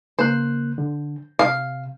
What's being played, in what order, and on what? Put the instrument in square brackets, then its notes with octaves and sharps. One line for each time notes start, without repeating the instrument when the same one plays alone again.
[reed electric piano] C#3 A#3 F#6 [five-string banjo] C5
[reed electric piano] D3
[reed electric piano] C3 [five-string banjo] F5